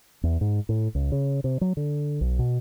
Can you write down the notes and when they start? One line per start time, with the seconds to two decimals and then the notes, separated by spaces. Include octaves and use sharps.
0.23 E2
0.41 G#2
0.69 A2
0.95 C#2
1.12 C#3
1.44 C3
1.61 F#3
1.77 D3
2.21 B1
2.39 B2